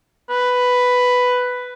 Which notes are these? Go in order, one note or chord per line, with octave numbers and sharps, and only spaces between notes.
B4